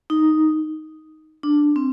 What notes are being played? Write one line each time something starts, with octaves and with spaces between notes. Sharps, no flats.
D#4
D4
C4